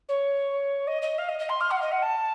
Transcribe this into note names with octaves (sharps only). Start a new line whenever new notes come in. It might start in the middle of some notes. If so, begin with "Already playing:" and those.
C#5
D#5
D#5
F5
D#5
D#5
C6
F6
F#5
F5
D#5
F#5
A5